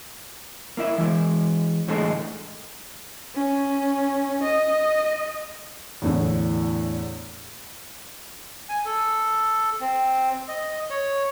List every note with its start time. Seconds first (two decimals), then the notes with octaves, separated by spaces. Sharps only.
0.77 A#3 E4 E5
0.98 E3 G#3
1.88 E2 A2 D3 G#3 A3 D#4
3.35 C#4
4.43 D#5
6.02 E2 A2 D3
8.69 G#5
8.85 A4
9.81 C4
10.49 D#5
10.90 C#5